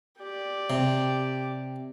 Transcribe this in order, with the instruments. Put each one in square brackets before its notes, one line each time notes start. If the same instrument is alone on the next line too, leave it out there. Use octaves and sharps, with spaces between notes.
[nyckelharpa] G4 D5
[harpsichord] C3